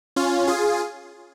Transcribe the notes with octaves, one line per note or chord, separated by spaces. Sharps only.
C#4 F4
F4 G#4